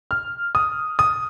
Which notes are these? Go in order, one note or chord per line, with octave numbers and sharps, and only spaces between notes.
F6
D#6
D#6